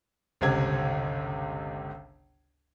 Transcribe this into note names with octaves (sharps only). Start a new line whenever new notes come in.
G1 C#2 C3 G#6